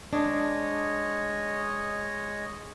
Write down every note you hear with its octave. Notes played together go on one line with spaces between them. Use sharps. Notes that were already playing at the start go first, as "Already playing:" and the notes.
G#3 D4 C#5 D#5